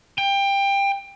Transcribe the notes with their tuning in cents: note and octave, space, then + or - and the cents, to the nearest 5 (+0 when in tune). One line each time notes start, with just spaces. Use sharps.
G5 +20